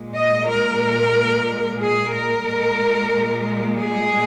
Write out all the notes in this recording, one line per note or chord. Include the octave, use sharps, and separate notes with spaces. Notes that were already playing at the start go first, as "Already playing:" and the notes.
Already playing: A#2 G#3
D#5
A#4
G#4
A#4
A#2 G#3
G#4